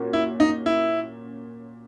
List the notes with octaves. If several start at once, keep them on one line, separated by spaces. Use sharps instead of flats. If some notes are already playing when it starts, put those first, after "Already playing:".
Already playing: A#2 A#3 C#4 F#4
E4
D#4
E4